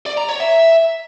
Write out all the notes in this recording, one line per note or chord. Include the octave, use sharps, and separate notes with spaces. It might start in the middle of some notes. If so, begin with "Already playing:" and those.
D5
A#5
C#5
E5